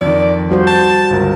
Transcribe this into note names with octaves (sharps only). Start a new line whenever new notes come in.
F2 D#3 D5
F3 G3 F#4 C5
A5 G6 A6
G1 C#2 A#4